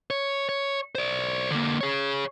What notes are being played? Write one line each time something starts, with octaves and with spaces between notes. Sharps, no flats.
C#5
C#5
C5 D5
D3 A#3
G#4 C#5